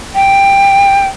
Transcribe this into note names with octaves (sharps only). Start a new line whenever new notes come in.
G5